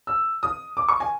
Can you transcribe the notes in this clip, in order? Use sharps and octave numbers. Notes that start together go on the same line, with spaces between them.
E6
D#6
D6
C#6
G#5